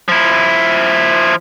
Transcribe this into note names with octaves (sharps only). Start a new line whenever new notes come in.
F3 E4